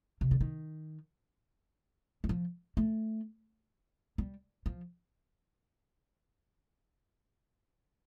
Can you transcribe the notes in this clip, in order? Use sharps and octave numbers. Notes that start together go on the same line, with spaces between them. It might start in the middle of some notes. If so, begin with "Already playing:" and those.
C3
D3
D#3
G3
F3
A3
G3
F3